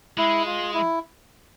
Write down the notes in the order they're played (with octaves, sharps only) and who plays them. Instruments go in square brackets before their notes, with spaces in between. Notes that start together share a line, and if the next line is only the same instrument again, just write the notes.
[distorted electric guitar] G#3 [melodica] E4
[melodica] F4
E4